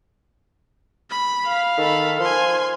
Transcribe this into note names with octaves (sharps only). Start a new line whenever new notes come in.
B5
F5
D#3 A4 B5
F3 G#5 C6